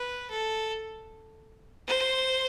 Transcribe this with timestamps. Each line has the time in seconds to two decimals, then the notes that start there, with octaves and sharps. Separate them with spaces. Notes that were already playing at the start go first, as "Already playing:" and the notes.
Already playing: B4
0.30 A4
1.87 C5